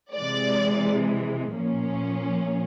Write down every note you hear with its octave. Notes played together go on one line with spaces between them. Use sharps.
C3 E3 G#3 D5
A#2 F3 A#3 C#4